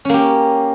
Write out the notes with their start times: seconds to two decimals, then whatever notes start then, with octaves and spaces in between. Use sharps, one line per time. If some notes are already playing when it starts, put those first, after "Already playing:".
0.05 C#4
0.09 A#3
0.14 G4